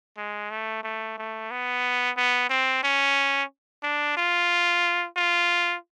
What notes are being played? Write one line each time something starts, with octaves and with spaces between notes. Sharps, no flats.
G#3
A3
A3
A3
B3
B3
C4
C#4
D4
F4
F4